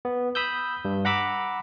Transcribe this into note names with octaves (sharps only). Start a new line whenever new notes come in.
B3
B5 D#6 E6 G6
G2
F#5 A#5 B5 D6 E6